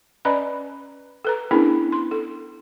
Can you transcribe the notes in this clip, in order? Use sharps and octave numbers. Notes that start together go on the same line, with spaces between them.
C#4 B4 D5 D#5 A#5 B5
A4 B4 A#5
B3 C#4 D4 E4 G#4 A#4
C6
A4